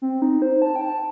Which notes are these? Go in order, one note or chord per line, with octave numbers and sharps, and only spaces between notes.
C4
D#4
C5
A5
G5
A5